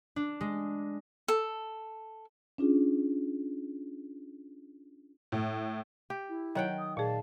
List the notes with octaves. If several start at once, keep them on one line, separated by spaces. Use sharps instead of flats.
D4
G#3
A4
C#4 D4 F4 G#4
A2
G4
E4
D#3 F#3 C#5 F#5 G5
D#6
A#2 G#4 D5 F5 A5